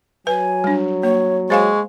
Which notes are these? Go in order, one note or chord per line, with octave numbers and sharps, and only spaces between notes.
F#3 B4 G#5
G3 D4
A#3 C#5
G#3 C5 F5 G#5 C#6